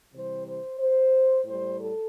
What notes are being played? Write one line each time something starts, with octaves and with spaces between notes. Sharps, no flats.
C3 E3 G3 C5
C5
C5
A2 G3 C5
A4